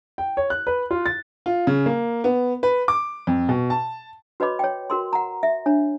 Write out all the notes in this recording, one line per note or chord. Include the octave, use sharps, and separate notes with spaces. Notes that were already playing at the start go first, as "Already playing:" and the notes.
G5
C#5
F#6
B4
F4
A6
F4
C#3
A#3
B3
B4
D6
F2
B2
A5
F#4 B4 C#5 D#5 B5 D6
C#5 G5
F#4 A#4 C6
F#5 A#5
E5
D4 C#5